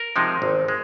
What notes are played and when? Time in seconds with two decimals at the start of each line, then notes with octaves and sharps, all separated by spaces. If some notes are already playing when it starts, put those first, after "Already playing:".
Already playing: A#4
0.16 C3 F3 G#3 D#4
0.42 G#1
0.68 G#3